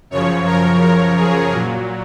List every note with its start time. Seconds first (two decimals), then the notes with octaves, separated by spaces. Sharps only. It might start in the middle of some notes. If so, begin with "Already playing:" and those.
0.10 F#2 C#3 F3 C#5
0.46 A#4
0.81 A#4
1.17 G#4
1.52 A#2 F#3